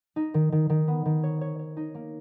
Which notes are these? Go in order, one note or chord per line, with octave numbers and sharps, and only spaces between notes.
D#4
D#3
D#3
D#3
B3
D#3
C#5
C#5
C#5
D#4
A#3